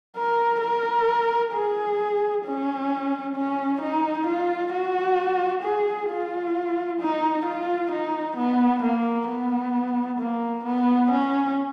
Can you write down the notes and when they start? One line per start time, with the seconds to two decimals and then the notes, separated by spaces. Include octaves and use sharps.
0.16 A#4
0.61 A#4
1.53 G#4
2.45 C#4
3.36 C#4
3.81 D#4
4.27 F4
4.72 F#4
5.63 G#4
6.10 F4
7.00 D#4
7.46 F4
7.91 D#4
8.37 B3
8.83 A#3
9.29 B3
10.19 A#3
10.65 B3
11.11 C#4